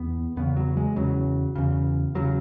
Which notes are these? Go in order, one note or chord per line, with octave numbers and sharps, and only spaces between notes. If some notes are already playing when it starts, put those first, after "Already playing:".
Already playing: E2 B3
E2 C#3 B3
F#3
G#3
E2 C#3 F#3
E2 C#3
E2 C#3 F#3